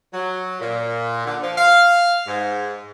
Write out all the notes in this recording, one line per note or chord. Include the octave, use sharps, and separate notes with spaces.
F#3
A#2
D3
F3
F5
G#2